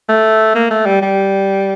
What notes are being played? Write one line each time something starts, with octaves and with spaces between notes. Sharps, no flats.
A3
A#3
A3
G3
G3